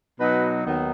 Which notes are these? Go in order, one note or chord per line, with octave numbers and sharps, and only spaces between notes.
B2 F#3 B3 D#4 B4
D#2 D#3 F#3 B3 D#4